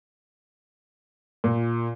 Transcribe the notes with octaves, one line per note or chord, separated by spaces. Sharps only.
A#2